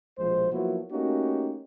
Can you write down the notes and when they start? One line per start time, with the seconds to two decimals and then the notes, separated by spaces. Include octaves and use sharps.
0.19 A#1 B2 F3 G#3 C5
0.52 F3 F#3 A#3 B3 E4 F#4
0.92 A3 A#3 C#4 D#4 F#4 G4